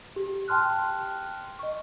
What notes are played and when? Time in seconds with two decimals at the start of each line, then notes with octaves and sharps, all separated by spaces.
0.16 G4
0.48 G5 A5 C6 F6 F#6
1.59 D#5 C#6